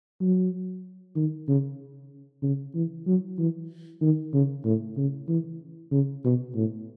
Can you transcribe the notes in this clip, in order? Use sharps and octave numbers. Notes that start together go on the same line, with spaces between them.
F#3
D#3
C#3
C#3
E3
F#3
E3
D#3
C#3
A2
C#3
E3
C#3
B2
A2